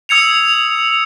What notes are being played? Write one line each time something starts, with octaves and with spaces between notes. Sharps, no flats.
D#6 E6 G#6 C#7 F7